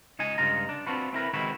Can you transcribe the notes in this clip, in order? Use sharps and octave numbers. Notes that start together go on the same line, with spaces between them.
C#2 D#4 D#5 G#5
C#2 G2 D#4 F4 A#5
D4
C4 D4 F4 F#4 B4
C4 E4 A#4 B4
D#3 G#3 C4 E4 F#4 B4